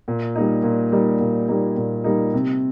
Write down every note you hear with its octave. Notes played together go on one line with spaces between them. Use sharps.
A#2
G3 A#3 D#4
A#2
G3 A#3 D#4
A#2
G3 A#3 D#4
A#2
G3 A#3 D#4
C3